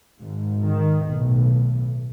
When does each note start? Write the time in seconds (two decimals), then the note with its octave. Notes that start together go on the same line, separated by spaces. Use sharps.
0.21 G#1 G#2
0.65 D#3
1.08 B1 A2